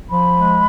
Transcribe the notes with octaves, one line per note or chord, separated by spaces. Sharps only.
F3 B5
G#3